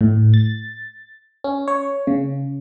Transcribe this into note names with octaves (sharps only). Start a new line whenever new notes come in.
A2
A6
C#4
C#5
C#3